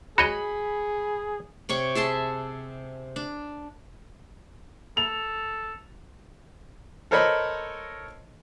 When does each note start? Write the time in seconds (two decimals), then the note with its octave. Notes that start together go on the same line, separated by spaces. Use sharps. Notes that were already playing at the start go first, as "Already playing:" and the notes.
0.18 F#4 G#4 C#5 D#5 B5 C#7
1.69 C3 C#5 G5 C#6
1.95 G#4 E5 A5 C6
3.16 D4
4.97 A4 F7
7.11 A4 A#4 C5 C#5 D#5 B5